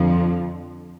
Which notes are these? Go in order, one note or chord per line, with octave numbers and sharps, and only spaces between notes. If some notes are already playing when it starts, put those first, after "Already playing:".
Already playing: F2 D3 F3